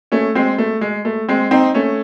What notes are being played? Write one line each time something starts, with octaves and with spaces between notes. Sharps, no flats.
A3 C#4
G#3 C4
A3
G#3
A3
G#3 C4
C4 D#4
A3 C#4